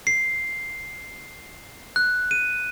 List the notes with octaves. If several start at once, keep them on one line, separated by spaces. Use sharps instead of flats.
C7
F#6
D#7